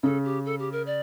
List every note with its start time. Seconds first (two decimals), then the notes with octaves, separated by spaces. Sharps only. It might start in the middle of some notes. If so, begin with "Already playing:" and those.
0.03 C#3 A4
0.25 G4
0.46 A4
0.59 G4
0.73 A#4
0.87 D5